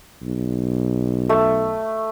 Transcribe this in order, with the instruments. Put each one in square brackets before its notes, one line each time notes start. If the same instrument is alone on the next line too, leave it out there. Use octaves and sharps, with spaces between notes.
[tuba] B1
[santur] A3